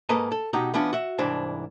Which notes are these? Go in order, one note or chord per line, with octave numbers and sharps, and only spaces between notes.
G#2 A#3 A4 B4 D#5 A#5
A4
B2 D#4 F#4 G4 A#5
E3 B3 C#4 D4 F4
F#4 E5
C2 G#2 E3 D4 C5 A5